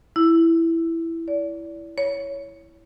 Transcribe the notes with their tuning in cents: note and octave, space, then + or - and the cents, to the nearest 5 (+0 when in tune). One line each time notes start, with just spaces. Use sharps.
E4 +5
D5 -30
C#5 +10